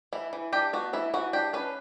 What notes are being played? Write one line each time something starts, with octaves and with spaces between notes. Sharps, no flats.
E3 E4
E3
D4 G4
B3 F#4
E3 E4
E3 F#4
D4 G4
C#4 B4